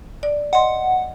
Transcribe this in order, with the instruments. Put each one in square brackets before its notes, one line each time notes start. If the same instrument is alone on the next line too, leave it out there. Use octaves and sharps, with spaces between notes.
[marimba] D5
[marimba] D#5 C6 [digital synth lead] F#5